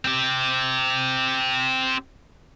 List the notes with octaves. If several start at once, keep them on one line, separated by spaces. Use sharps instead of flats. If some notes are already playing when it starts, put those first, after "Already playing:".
C4 G4